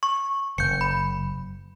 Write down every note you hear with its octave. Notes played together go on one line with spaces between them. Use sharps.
C#6
F#1 G6 C#7
B5